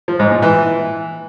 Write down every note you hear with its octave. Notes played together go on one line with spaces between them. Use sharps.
F3
G#2
A#2
E3